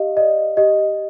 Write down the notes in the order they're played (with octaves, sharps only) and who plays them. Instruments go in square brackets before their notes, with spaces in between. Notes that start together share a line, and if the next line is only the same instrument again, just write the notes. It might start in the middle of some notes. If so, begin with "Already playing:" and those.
Already playing: [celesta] G4 D#5 F5
D5 D#5
G4 D#5